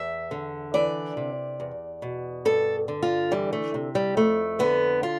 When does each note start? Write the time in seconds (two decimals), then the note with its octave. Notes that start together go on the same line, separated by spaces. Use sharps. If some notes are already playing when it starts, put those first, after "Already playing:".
Already playing: E2 E5
0.31 D3
0.74 E3 D5
1.17 C3
1.60 E2
2.02 B2
2.45 G2 A4
2.88 D3
3.03 F4
3.31 E3 G3
3.53 A3
3.74 C3
3.95 G3
4.17 F2 A3
4.59 D3 B3
5.03 F4